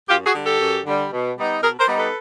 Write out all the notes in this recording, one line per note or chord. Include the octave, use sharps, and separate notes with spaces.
F#2 F4 G4
F#4 G#4
D3 G3
G4 A4
F#2
D3 G3
B2
G3 B3 D#4
B2 G#4 A#4
A#4 C5
G3 B3 D#4
A4 B4